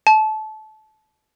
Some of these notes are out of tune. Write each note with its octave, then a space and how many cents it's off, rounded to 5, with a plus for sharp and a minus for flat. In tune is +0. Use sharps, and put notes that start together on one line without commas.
A5 -25